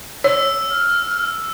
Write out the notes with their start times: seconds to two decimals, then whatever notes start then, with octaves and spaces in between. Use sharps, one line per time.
0.24 C#5 E6
0.70 F6